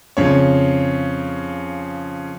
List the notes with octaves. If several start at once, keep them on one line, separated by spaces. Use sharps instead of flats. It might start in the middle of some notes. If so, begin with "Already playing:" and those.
F2 C#3 C#5